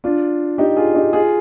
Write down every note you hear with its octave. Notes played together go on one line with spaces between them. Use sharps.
D4 F4
D#4 G4
F4 G#4
D#4 G4
F4 G#4